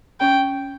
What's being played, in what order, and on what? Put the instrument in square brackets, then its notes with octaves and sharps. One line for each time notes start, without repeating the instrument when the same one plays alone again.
[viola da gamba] C#4 [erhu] G5